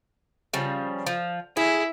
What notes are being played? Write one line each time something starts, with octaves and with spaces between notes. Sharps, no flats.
C#3 F3 G3
F3
E4 G#4